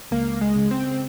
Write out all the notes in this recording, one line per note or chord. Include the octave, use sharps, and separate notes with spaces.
C#2 A#3
G#3
C#3
C4